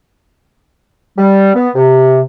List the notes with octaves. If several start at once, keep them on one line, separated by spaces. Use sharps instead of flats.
G3
B3
C3